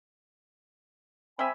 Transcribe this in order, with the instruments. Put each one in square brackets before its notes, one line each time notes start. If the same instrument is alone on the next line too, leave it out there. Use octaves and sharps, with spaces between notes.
[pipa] G3 E5 [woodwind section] C4 G#5 B5